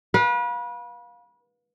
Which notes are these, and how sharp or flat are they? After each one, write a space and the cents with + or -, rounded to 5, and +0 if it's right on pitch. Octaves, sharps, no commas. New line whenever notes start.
B4 -30 F5 +25